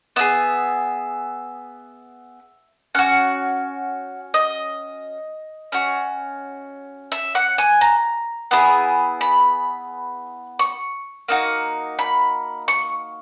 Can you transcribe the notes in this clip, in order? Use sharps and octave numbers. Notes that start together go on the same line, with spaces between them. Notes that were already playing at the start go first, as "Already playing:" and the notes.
B3 D#4 G#4 E5
C#4 F#4 F#5
D#5
C#4 F#4
E5
F#5
G#5
A#5
B3 E4 G#4
B5
C#6
A#3 D#4 F#4
B5
C#6